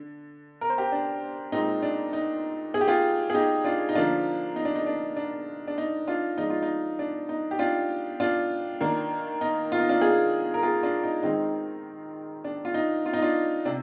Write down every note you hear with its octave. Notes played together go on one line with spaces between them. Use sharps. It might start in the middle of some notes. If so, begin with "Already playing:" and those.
Already playing: D3
A#4
C5
G4 A#4
D4
A#2 G#3 C4 D#4
D4
D#4
G#4
G4
F4 G#4
G#4
D#4 G4
D4 F4
D#4
D3 F3 A#3 D4 F4
D#4
D4
D#4
D4
D4
D4
D#4
D4 F4
F3 G#3 D4 D#4
F4
D#4
D4
D#4
G4
D4 F4
D4 F4
D#3 A#3 D4
D#4
F4
D#4
D4 F4
F4 G#4
A#4
F4 G#4
D4 F4
D#4
D#3 G#3 C4 D#4
D4
F4
D#4
F4
D#4
D4 F4
C3 D4